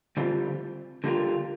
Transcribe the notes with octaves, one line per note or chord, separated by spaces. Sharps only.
D3 G3 C4 F4
D3 G3 A#3 F4